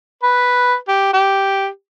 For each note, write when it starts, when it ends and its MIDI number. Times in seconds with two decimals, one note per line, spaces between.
0.23 0.75 71
0.88 1.10 67
1.13 1.67 67